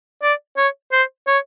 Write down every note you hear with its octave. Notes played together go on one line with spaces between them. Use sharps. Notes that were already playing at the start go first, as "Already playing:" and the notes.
D5
C#5
C5
C#5